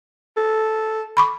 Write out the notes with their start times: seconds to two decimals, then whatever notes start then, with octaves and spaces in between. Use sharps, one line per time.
0.37 A4
1.17 B5 C#6 D6